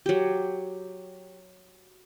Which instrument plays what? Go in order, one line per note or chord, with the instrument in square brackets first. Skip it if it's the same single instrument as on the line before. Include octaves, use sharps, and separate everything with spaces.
[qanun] F#3 G4